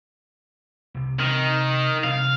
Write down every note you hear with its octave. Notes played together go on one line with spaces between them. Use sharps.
C2 C3
C3 D#3 C4
G2 C3 F5